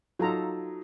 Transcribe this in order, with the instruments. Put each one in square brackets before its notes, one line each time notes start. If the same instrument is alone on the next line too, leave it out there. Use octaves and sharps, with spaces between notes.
[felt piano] F#3 D#4 [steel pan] F4 A4 A#5